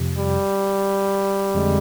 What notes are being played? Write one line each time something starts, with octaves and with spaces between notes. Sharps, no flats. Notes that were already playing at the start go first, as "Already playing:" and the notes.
Already playing: F2 C3 F3
G3
F2 D3 G#3